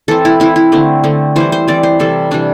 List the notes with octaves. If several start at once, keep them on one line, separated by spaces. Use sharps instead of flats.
E3 C4 A4
E4
E3 C4 E4
E4
D3 A3 C4
D3 A3 C4
E3 G3 C4 C5
C5
E3 G3 C4 D5
C5
C3 E3 G3 A4
C3 E3 G3 D4